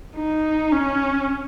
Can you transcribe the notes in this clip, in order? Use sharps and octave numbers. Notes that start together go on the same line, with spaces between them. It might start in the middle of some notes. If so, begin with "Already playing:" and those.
D#4
C#4